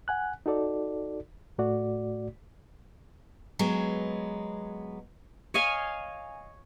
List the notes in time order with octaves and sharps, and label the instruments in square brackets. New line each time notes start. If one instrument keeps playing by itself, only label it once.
[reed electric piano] F#5 G#5 F#6
D#4 F#4 A4 D5
A2 A3 F#4 D5
[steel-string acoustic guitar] F#3 G#3 B3
[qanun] C#5 D#5 F5 G#5